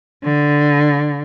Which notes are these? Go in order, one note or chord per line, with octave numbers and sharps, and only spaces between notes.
D3